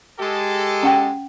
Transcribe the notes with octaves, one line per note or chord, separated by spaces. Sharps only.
G#3 G4 A4
C#4 F#5 G5